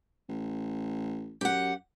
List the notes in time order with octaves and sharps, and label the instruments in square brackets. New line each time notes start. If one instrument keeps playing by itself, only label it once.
[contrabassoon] A1
[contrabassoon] F#2 [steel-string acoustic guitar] G4 F#5